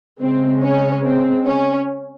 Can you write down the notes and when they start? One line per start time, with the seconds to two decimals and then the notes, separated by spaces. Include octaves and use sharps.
0.21 C#3 G#3 C4
0.63 C#4
1.05 C4
1.46 C#4